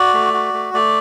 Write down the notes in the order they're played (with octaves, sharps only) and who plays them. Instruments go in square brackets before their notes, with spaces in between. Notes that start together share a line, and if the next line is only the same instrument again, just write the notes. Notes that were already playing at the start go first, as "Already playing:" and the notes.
Already playing: [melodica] F#4 D5
A3
F#4
A3
A3 D5